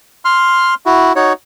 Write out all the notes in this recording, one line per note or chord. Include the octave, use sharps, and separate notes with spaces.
C6 F6
E4 F#4
D#4 F#4 C#5